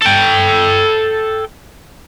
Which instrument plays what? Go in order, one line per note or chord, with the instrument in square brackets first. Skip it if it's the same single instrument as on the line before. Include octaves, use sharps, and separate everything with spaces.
[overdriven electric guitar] A4 G5